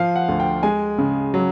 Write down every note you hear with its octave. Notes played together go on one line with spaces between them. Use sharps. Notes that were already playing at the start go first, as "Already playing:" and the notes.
Already playing: F3 F5
F#5
D2
G5
G#3 G#5
C#3
F#3